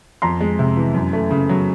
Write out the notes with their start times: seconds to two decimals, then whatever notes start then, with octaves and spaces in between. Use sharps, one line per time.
0.22 F2 A#5 C6
0.41 G#3
0.59 C3
0.77 E3
0.94 F#2
1.13 A3
1.31 C#3
1.49 F#3